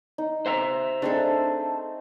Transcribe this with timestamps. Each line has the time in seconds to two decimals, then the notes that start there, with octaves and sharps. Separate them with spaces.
0.18 D#4
0.46 C5 E5 A#5
1.02 A3 C4 D4 D#4 G#4 A4